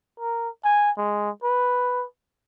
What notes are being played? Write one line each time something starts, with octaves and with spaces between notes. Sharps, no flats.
A#4
G#5
G#3
B4